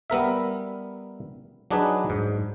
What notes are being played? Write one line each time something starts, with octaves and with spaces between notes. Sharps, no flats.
G3 B3 A#4 E5
F#3 D4 D#4 G#4 B4
G#2